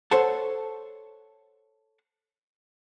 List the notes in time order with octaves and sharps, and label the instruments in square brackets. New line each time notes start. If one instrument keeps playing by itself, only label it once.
[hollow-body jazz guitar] A4 C5 C#5 F#5 A5